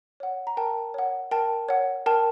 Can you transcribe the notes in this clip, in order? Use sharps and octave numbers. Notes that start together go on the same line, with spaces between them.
C#5 F#5
A#5
A#4 G5 A5
C#5 F#5
A#4 G5 A5
C#5 F#5
A#4 G5 A5